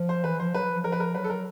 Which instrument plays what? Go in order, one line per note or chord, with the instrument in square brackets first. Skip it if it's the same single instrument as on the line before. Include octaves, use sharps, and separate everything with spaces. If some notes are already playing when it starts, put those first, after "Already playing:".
Already playing: [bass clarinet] F3
[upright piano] C5
[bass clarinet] E3 [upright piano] B4
[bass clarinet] F3 [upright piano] C5
[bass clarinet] F#3 [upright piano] B4
[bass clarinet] F3
[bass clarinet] F3 [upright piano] A#4
[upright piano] B4
A#4
[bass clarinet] F#3 [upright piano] B4
[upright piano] A4
A#4